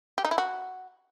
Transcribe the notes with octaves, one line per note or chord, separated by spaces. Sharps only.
G4
D#4
E4
F#4